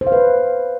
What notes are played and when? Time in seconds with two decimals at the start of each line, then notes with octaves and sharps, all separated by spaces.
0.01 C5
0.07 F5
0.12 B4